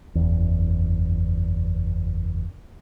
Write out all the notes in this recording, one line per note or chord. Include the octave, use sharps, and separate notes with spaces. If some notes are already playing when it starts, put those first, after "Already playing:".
F#1 E2